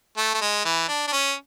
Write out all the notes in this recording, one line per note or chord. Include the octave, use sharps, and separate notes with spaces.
A3
A3
G#3
E3
D4
D4
C#4